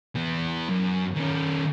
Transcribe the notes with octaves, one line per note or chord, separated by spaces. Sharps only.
E3 B3
F#2
D#3 C#4